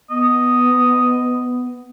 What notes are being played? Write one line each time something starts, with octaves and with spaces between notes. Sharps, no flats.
B3 D#5